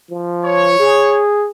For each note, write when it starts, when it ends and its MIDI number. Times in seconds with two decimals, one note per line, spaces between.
0.10 0.77 53
0.45 1.23 73
0.80 1.49 68